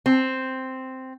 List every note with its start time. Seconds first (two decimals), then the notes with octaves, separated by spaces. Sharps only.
0.06 C4